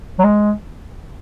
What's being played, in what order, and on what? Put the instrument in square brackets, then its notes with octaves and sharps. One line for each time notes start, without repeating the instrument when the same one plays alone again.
[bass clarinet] F#3
G#3